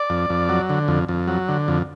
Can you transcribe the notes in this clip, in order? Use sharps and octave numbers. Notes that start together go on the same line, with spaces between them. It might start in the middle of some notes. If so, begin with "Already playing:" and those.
Already playing: D5
F2
F2
F#3
D3
F2
F2
F#3
D3
F2